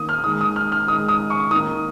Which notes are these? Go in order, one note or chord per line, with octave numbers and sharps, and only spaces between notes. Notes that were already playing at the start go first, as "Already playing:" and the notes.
Already playing: D#3 A#3 D#6
F6
D#3 G#3 D#6
D#6
F6
F6
D#3 G#3 D#6
D#6
C#6
D#3 A#3 D#6